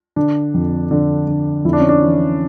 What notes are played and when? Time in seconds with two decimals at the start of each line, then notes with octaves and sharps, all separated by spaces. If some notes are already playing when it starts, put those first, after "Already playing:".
0.16 D3 D4
0.54 F2
0.91 D3
1.28 D3
1.65 F2 E4
1.73 D4
1.80 C#4
1.89 D4
2.01 E3